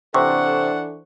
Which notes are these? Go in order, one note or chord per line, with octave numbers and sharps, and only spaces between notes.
C3 E3 D4 A4 C5 F#5 C#6